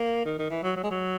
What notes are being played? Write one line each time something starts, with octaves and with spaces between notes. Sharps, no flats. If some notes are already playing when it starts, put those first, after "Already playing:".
Already playing: A#3
D#3
D#3
E3
F#3
F#3
G#3
F#3